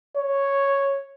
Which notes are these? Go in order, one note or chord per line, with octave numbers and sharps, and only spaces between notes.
C#5